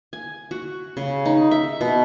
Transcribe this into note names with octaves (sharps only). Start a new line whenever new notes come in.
G#5
F#4
C#3
D#4
E5
B2